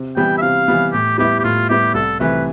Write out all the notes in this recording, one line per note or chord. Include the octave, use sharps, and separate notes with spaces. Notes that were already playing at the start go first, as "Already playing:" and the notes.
Already playing: C3
E3 G3 B3 G5
E5
C3 F5
E3 G3 B3
A2 G4
G3 B3 E4 G4
G4
A2 F4
G3 B3 E4 G4
C2 A4
C3 E3 A3 B4